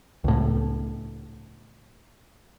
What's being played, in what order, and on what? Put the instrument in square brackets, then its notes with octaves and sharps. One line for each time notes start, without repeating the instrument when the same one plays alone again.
[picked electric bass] C#2 A2